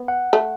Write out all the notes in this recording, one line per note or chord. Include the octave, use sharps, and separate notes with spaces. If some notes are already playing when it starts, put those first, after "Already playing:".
Already playing: B3
F#5
A3